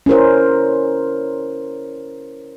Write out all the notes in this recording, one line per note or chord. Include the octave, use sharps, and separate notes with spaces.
C#4 E4 A#4 C5